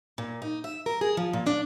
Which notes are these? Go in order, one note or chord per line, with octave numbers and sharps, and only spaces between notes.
A#2
D#4
E5
A#4
G#4
F3
A#2
D4